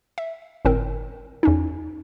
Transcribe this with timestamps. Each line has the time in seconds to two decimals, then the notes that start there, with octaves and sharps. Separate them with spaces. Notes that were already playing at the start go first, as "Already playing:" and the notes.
0.18 E5
0.65 G1 A2 C4 A#4
1.43 E2 C#4 D#4